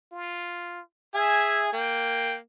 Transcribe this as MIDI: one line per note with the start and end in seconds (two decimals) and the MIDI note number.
0.12 0.81 65
1.15 1.72 68
1.15 1.72 76
1.15 1.72 80
1.73 2.37 58
1.73 2.37 79